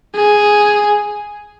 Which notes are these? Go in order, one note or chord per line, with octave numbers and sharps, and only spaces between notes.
G#4